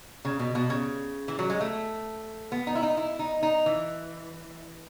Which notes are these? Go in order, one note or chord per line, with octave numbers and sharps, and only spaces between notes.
C#3
B2
B2
C#3
E3
F#3
G#3
A3
B3
D#4
E4
D#4
E4
D#4
D#4
E3